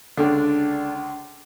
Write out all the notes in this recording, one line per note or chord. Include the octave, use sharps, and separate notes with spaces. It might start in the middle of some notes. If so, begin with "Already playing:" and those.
C#2 D3 D4